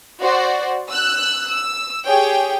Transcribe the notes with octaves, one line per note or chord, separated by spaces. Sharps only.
F#4 C5 D5
E6 F#6
E6
G4 G#4 C#5 G5